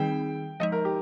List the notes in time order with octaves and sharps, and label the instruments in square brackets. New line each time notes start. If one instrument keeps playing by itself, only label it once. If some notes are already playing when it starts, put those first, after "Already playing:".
Already playing: [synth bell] D#3 G3 C4 D#4 G#4 [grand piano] G5
[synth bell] F3 G#3 D#4 [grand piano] D#5
[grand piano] A#4
G4